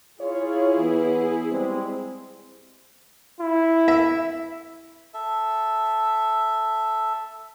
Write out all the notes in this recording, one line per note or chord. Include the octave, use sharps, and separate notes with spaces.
E4 F4 G#4 C#5
E3 B3
G3 G#3 C4
E4
E5
A4 E5